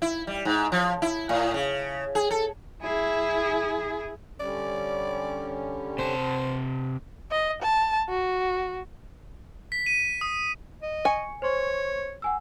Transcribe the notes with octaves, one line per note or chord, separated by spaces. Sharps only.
E4
G3
G#2
F3
E4
A2
C#3
G#4
A4
E4 G#4
D3 G3 C#4 D5
C3 C5 A5
D#5
A5
F#4
B6
D#7
D#6
D#5
G#5 C#6 C#7
C5 C#5 C6 C#6
F#5 G#5 E6